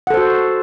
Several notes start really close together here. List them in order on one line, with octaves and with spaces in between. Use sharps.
F#5 A4 C5 F#4